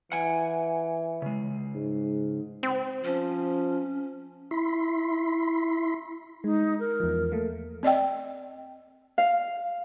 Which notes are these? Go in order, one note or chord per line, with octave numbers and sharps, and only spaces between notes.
E3 F#5 G#5
C#3 G#3
G#2
C4
F3 C#4
E4 B5 C6
G#3 D#4
A#4
E2 F3
A3 A#3
C4 D5 D#5 G5
F5